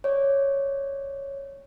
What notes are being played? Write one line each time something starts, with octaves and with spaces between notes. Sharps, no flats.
C#5 D5